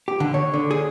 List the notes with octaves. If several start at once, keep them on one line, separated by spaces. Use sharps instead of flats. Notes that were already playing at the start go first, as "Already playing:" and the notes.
G4
D3
C#5
D3
G#4